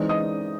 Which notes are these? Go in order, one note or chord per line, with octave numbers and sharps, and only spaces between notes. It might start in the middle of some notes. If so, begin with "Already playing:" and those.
Already playing: E3 G#3 C4 D#4 D5
D#5 D#6